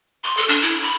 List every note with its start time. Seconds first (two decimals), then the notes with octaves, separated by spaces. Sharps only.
0.24 C6
0.37 A4
0.48 D4
0.62 E4
0.81 B5